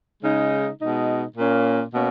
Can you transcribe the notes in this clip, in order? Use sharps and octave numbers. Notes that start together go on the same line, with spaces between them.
C#3 G#3 D#4
B2 G#3 D#4
A#2 A#3 C#4
B2 A#3 C#4